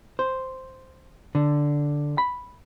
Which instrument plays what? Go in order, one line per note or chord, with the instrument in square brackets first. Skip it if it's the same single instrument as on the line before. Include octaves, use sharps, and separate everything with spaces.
[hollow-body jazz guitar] C5
D3
B5